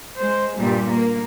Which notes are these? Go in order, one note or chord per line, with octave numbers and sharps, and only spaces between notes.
G#3 C5
G2 A#2 G3
A#3